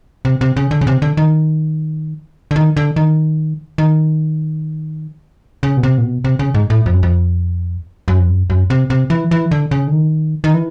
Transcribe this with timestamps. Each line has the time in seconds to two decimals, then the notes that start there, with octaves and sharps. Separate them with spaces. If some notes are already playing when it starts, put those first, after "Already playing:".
0.25 C3
0.41 C3
0.57 C#3
0.71 D3
0.81 C#3
0.87 C3
1.02 D3
1.17 D#3
2.51 D3
2.56 D#3
2.77 D3
2.96 D#3
3.78 D#3
5.63 C#3
5.77 B2
5.83 C3
5.98 A#2
6.04 B2
6.24 C3
6.39 C#3
6.54 G#2
6.70 A2
6.86 F2
6.93 F#2
7.03 F2
8.08 F#2
8.19 F2
8.29 F#2
8.50 F#2
8.70 C3
8.90 C3
9.10 E3
9.31 E3
9.51 D3
9.71 C#3
9.87 D3
9.92 D#3
10.44 D#3
10.54 E3